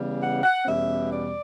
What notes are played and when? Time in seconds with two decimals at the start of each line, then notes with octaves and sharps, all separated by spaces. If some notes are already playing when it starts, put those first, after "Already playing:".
Already playing: C#3 E3 G3 B3
0.20 F#5
0.43 F#5
0.65 E2 B2 G3 C#4 E5
1.10 D5